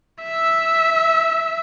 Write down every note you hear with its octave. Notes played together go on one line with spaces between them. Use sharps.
E5 E6